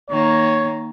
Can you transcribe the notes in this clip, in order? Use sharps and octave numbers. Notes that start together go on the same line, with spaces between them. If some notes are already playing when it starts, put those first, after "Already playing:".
D#3 A#3 C#5